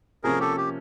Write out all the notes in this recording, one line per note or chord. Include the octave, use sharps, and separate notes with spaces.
C3 F3 A#3 C#4 G#4 A#4
G4 A4
G4